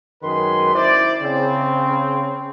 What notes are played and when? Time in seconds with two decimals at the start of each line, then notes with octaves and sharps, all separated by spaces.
0.23 F#2 D#3 G#3 B4 C6
0.75 E4 C5 D5
1.22 C#3 C4